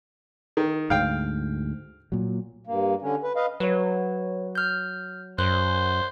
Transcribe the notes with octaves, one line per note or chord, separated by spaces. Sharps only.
D#3
D2 G#2 F5 G5
A#2 F#3
G2 A#3
D3 C#4
B4
B4 D#5 F5
F#3 B4 C#5
F6 G6
F#2 C5 F#6